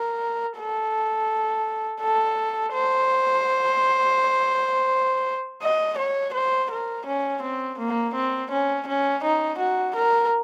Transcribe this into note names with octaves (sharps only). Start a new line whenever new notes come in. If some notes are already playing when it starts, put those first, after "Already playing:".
Already playing: A#4
A4
A4
C5
D#5
C#5
C5
A#4
C#4
C4
A#3
C4
C#4
C#4
D#4
F#4
A#4